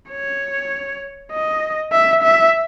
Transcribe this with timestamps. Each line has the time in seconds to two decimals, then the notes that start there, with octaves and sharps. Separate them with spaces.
0.11 C#5
1.32 D#5
1.92 E5
2.23 E5